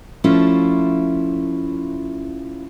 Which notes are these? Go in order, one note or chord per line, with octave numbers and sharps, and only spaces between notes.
F3 A3 C#4 E4 F4